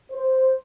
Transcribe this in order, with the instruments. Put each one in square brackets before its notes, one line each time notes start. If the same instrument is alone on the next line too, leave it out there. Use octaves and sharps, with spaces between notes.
[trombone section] C5